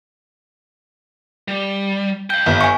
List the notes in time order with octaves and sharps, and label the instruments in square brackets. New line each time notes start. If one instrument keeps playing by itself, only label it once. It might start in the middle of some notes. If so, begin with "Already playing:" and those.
[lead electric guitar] G3
[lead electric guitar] F5 G5 [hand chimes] G6
[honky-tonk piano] G1
[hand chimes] G#5 C#6